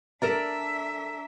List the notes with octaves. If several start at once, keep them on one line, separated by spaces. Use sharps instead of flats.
D4 A4 A#4 D5 E5 A#5 E7